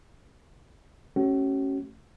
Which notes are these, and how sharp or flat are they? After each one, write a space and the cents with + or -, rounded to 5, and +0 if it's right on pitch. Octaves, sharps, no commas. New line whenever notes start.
A3 +0 C#4 -15 F#4 +45